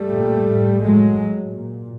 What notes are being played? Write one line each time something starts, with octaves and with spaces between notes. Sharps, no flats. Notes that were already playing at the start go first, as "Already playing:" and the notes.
Already playing: G3 A3
A#2
A2
A2 F#3 G#3
A2
A#2